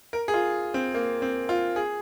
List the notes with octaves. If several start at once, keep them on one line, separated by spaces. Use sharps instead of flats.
A#4
G#4
F4
C4
A#3
C4
F4
G#4